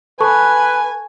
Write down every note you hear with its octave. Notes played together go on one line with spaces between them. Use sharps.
A4 B4 G#5 A5 C#6